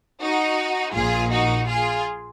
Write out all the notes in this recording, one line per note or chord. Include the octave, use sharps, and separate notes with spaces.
D#4 F#4
A#1 A#2 F4 G#4
D#4 F#4
F4 G#4